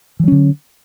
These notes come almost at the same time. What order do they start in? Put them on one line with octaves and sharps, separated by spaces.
E3 F#3 C#4 D3